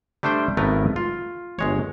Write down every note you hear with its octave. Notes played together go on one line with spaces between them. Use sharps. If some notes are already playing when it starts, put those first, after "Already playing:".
G3 A3 D4 C5 G5
G#1 A3 B3 A#4 B4
F4
G1 G#3 C#5